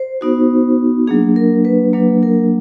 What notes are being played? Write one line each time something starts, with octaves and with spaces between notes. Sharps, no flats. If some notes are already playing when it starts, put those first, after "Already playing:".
Already playing: C5
B3 D#4 F#4
F#3 A#3 D4 G#4
A#4
B4
F#3 A#3 D4 B4
A#4